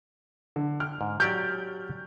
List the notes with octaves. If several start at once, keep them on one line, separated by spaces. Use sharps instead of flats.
D3
G5 F6
G#2
F#3 G4 D5 F6 G6